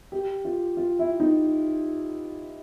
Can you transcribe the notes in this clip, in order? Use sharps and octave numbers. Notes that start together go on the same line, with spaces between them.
G4
F4
F4
E4
D#4